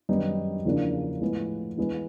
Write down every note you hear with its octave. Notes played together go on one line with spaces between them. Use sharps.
F#2 D#3 G3 B3 D#4
E2 C#3 F3 A#3 D4
A2 F3 G#3 B3
E3 G#3 B3